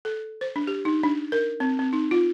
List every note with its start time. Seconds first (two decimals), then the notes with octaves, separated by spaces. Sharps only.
0.05 A4
0.41 C5
0.56 D4
0.67 G4
0.85 D#4
1.03 D4
1.32 A#4
1.60 C4
1.79 C4
1.93 D#4
2.11 F4